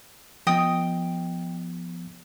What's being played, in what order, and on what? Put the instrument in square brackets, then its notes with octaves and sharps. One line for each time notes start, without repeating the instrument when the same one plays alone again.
[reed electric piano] F3 B3 [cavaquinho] D#5 G5 D#6